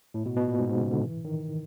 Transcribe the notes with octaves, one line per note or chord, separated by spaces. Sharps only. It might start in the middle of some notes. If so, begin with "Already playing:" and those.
A2
B2
B2
A#2
G#2
G#2
C#3
D3
E3
D#3